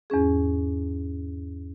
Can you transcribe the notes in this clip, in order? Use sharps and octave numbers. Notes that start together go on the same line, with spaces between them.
E2 G#2 C#4 G#4